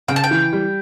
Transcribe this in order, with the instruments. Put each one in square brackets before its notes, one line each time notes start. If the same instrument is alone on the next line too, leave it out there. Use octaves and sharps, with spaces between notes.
[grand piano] C#3 [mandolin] G5
[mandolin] A5
G5
[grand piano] E3
G3